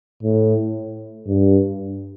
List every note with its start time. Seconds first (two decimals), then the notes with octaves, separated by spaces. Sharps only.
0.23 A2
1.27 G2